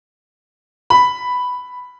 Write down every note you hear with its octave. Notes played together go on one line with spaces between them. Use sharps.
B5